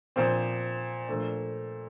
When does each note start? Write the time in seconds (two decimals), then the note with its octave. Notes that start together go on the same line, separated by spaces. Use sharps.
0.16 A#2 F3 C4
1.07 A#2 F3 A3 D4